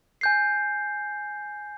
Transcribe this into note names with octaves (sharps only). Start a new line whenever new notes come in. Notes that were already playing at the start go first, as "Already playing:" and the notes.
G#5 G6 C7